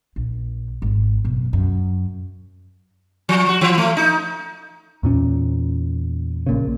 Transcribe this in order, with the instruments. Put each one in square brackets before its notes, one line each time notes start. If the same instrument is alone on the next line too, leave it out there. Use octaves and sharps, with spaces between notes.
[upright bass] A#1
G#1
F#2 B2
F#2
[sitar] F3
F#4
E3
A3
D#4
[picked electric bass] E2 A#2 C#4
A#1 A#2 C#3